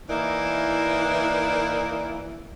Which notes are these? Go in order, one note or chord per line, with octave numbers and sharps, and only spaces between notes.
E3 A#3 D#4 E4 A#4 D5